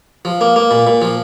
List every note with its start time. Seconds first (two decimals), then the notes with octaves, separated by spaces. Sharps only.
0.25 F3
0.41 A#3
0.56 A#3
0.71 A#2
0.87 A#2
1.02 F3